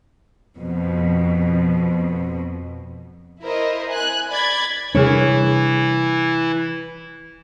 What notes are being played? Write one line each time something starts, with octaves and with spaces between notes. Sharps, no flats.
F2 B2
E4 A#4 C5 D#5
G#5 F#6
D5 B5 G#6 A6
C3 E3 G3 D4 E4 G#4 A#4 C#5